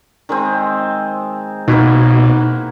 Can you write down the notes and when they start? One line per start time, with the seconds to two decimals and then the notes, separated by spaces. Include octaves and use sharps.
0.29 D#3 G#3 C4
1.68 B2 A#3 D#4 E4 F#4